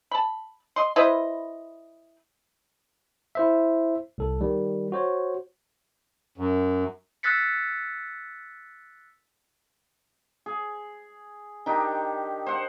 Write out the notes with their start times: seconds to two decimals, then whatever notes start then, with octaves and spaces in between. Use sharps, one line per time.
0.11 A5 B5
0.76 D#5 C6
0.96 E4 B4 C5 D#5
3.35 E4 C5 E5
4.18 C2 A4
4.41 D#3 G3
4.92 F#4 C5 C#5
6.38 F#2
7.23 E6 F#6 A6 B6 C#7
10.46 G#4
11.66 D#3 D4 D#4 G4
12.46 C5 F#5